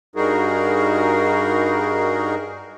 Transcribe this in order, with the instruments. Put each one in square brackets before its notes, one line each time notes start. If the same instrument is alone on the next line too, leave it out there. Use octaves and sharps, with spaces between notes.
[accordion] G2 G3 D#4 F#4 G#4 A#4